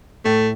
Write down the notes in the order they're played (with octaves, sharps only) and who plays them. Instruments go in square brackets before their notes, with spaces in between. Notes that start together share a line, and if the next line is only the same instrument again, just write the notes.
[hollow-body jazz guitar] A2 [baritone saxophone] A3